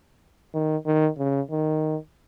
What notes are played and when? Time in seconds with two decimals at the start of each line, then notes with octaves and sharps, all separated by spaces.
0.54 D#3
0.86 D#3
1.18 C#3
1.51 D#3